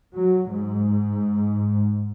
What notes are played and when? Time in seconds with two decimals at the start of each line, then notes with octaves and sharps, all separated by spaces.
0.15 F#3
0.53 G#2